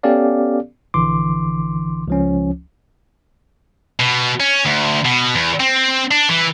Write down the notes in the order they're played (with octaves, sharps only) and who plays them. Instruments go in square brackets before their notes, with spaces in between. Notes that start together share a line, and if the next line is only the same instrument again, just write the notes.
[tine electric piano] B3 C#4 G4 A4 D5 F5
A#1 D3 E3 C6 D6
C#2 F3 C#4
[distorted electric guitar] B2
C#4
D2
B2
E2
C4
D4
E3